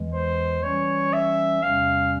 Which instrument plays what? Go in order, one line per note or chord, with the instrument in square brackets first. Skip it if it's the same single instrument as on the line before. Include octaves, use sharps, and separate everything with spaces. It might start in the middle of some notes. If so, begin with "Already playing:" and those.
Already playing: [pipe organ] E2 E3 G#3
[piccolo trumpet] C5
[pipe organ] E3 G3 C#4 [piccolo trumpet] C#5
[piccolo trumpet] E5
[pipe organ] E2 C3 G3 C#4 [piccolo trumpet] F5